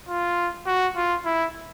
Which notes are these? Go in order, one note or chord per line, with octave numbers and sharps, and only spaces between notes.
F4
F#4
F4
E4